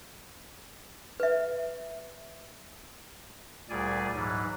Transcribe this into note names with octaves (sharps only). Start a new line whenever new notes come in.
B4 E5
D2 A#2 G3 G#4 D5 G#5
G#2 E3 F#3